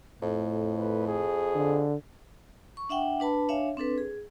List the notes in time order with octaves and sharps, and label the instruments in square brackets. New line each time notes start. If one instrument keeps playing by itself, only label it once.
[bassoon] F2 [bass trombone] A2
[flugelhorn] B4
G#4
[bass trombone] D3
[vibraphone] C#6
D4 E5 F#5 G5
D4 B4 A5 B5
D4 C#5 E5 F5 G#5
C4 D4 A4 B4
G#4